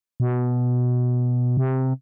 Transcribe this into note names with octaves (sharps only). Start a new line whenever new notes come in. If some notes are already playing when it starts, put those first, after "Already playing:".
B2
C3